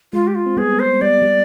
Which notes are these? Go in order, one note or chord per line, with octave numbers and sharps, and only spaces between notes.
G#3 F4
G4
F4
C4
G3 B3 G#4
C5
G3 B3 D5
G3